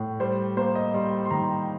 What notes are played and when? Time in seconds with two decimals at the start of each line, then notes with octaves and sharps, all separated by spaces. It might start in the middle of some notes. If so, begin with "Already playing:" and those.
Already playing: A2
0.20 G3 C5
0.57 A#3 C5
0.75 D#5
0.94 G3 C6
1.25 C6
1.31 D#3 A#5